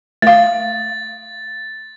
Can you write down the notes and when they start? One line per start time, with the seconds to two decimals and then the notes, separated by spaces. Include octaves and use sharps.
0.22 A3 F5 A6